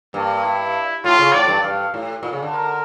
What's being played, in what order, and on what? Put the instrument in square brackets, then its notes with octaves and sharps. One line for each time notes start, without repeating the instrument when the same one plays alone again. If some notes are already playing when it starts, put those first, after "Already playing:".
[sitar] G2 [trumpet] A#3
[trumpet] E4
[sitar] A2 [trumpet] F4
[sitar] C#3
[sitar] A2 [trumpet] D5
[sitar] G2
[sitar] G2 [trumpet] F5
[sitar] A2
A#2
C#3
D3
[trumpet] A#4